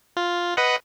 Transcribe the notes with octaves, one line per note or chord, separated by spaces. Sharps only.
F4
B4 D#5 F#5